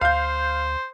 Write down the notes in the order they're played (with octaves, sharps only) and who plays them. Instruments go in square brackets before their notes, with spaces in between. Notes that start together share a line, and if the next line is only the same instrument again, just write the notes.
[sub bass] D2 [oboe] C5 [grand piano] F5 G6